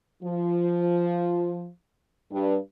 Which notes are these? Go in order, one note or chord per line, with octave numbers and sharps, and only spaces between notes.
F3
G2